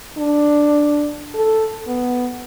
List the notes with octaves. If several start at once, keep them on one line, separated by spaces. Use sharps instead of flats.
D4
A4
B3